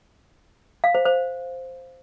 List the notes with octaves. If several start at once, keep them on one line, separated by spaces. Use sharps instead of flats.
F5
C5
C5